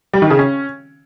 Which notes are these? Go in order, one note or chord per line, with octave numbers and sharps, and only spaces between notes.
G3
D#3
C#3
C#4